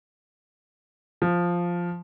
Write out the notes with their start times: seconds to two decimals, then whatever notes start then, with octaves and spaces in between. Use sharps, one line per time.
1.22 F3